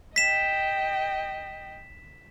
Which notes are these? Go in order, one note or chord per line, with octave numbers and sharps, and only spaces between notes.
D#5 G5 B6 E7